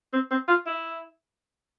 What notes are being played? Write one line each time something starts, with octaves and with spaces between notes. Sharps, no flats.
C4
C4
F4
E4